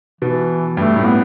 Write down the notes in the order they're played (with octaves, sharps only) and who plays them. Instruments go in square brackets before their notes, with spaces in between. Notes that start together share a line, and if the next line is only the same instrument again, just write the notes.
[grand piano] B2 [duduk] E3
[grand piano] G2 [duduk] A3
[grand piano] A2
[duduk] B3